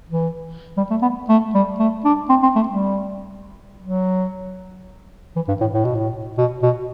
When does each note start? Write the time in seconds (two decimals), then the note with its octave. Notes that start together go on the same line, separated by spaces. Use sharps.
0.09 E3
0.77 G3
0.91 A3
1.02 B3
1.29 A3
1.54 G3
1.79 A3
2.05 D4
2.29 C4
2.43 C4
2.55 A3
2.68 G3
3.82 F#3
5.36 E3
5.48 G2
5.61 A2
5.73 A2
5.85 B2
5.95 A2
6.38 B2
6.63 B2